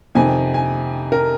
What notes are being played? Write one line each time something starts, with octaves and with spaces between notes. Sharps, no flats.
F2 C3 D#3 G#5
G#5
A#4